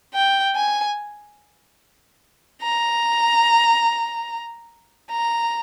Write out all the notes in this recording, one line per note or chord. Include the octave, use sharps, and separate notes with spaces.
G5
G#5
A#5
A#5